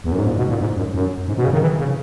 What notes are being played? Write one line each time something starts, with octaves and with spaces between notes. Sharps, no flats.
E2
F#2
G#2
A#2
B2
A#2
G#2
F#2
F#2
G#2
B2
C#3
D#3
E3
C#3